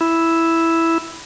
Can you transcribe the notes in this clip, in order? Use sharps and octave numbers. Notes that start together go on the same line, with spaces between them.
E4